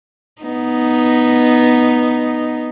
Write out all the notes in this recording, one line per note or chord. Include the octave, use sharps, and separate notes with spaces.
B3 D#4